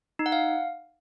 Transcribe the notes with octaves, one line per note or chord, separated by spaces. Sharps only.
D#4
F#5
F5